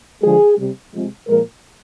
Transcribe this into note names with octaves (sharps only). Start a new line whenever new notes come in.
D3 F3 G#3 G#4
C3 G3
C3 F3 G#3
A#2 F3 G#3 A#4